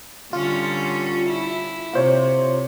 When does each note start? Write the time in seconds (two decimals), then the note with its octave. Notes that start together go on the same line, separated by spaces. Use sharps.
0.33 D3 G3 C#4 F4
1.30 E4
1.93 C3 F4 C5 C#5